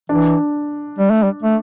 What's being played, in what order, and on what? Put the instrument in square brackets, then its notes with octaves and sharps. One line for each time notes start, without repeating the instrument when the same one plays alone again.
[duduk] E3 [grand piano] D4
[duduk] G3
A3
G3
A3